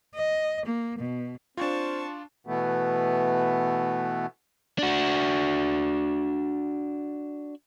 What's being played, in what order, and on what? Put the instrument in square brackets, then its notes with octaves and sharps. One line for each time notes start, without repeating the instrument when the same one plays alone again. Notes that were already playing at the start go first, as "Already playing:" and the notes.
[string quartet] D#5
A#3
B2
[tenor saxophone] C4 [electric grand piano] D4 F4 [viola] A5 C#6
[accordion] B2 E3 A3 B3
[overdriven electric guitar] D4 F#4